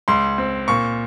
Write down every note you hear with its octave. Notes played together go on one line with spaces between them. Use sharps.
C#2 C6
C4
A#2 C#6